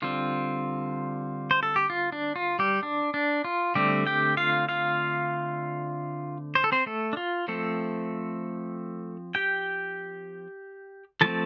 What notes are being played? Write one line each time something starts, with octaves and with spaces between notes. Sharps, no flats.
D3 G3 C4 F4
C5
A4
G4
F4
D4
F4
G3 G4
D4
D4
F4
D3 G3 A3 C4 G4
G4 G5
F4 F5
F4 F5
C5
A4
C4 C5
A3 A4
D4
F4
F3 A3 C4 A4
G4 G5
F3 A3 C4 A4 A5